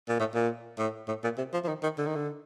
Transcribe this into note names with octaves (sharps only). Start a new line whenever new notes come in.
A#2
A2
A#2
A2
A2
A#2
C3
F3
F3
D#3
D#3
D3
D#3
D3